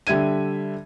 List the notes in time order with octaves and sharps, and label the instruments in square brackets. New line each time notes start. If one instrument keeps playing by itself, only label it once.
[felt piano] D3 G3 E5 G#6 D#7